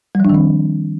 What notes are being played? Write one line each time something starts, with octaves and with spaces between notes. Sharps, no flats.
D#3 F3 G3 C4 D4